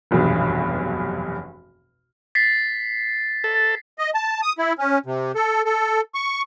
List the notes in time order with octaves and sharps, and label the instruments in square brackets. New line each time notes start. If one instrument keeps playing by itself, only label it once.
[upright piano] F1 B1 E2 G2 B2
[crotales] A6 B6 C7
[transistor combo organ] A4
[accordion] D#5
A5
D#6
E4
C#4
C3
A4
A4
C#6